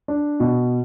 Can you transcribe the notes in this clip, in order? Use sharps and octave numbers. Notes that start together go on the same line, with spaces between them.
D4
B2